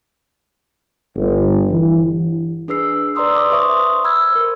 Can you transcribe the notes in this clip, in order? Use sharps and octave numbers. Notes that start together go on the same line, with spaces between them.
G1
E3
D4 G#4 B4 E6 C7
B4 D5 A#5 C6 D#6 E6
C6 D6
B4 C5 E5 C6 C#6 D#6
B5 E6 F6 G#6
A#4 C5